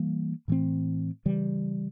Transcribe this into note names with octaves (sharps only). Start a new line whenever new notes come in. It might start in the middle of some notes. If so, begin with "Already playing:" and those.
Already playing: E3 G3 A#3
A2 E3 A3 C4
C#3 E3 G3